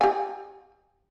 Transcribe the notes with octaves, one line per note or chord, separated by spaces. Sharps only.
G4 G#5